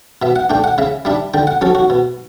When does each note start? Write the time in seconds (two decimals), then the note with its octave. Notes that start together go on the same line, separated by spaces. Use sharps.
0.22 B2 E5
0.36 F#5
0.50 A3 D4 G5
0.64 F#5
0.78 C#3 E5
1.05 G3 D4 E5
1.34 D3 G5
1.47 F#5
1.61 F#3 C#4 A4
1.75 F#4
1.90 B2